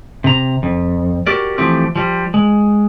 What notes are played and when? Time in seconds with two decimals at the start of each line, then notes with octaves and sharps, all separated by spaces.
0.24 C3 A#5
0.63 F2
1.27 F#4 G4 A#4 D5
1.58 E3 F3 A3 C4 G4
1.96 F3 G3
2.34 G#3